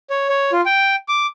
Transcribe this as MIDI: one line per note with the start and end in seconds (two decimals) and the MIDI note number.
0.10 0.28 73
0.29 0.51 73
0.52 0.61 65
0.66 0.96 79
1.08 1.26 86